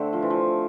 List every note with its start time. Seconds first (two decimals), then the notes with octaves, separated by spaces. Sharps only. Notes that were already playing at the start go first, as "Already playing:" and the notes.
Already playing: D3 A3 C4
0.13 F3
0.22 E3
0.30 F3